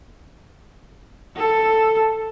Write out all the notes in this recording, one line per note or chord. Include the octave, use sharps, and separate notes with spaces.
A4